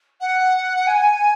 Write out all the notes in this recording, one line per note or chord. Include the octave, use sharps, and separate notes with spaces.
F#5
G#5